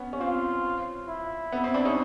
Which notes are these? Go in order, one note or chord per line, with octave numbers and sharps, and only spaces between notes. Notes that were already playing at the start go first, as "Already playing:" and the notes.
Already playing: B3 C#4
C#4
C4 F4
E4
B3
C4
C4 D4
C#4 D#4